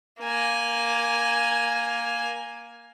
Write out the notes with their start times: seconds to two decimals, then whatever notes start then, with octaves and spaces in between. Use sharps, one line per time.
0.21 A#3 G#5